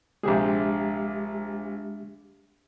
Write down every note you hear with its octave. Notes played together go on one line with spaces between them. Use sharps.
A#1 C3 G#3 G4 G#4 E5